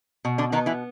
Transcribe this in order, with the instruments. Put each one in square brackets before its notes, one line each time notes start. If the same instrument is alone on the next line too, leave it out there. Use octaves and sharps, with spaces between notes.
[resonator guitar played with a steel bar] B2
D3 D4
D#3 B3 D#4
E3 E4